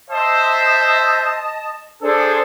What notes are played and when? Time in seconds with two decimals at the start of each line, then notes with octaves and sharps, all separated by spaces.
0.10 C5 D#5 E5 A5 D#6
2.02 D4 G#4 A4 C5